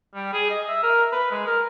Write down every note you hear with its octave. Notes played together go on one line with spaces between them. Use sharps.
G3
G#4
D#5
E5
A#4
B4
G#3
A#4